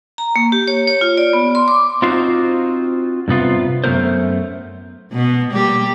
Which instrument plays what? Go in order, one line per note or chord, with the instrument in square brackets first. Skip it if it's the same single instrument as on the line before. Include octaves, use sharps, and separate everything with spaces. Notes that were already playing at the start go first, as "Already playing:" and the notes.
[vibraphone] A#5
A#3
G4
C#5
C#5
F4
D5
B3
C6
D6
[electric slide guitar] C4 D#4 F4 F#4 C5
G2 C3 B3 F4
F#2 A3 B3 A#4 C5
[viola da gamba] B2 B3
G3 A#3 G4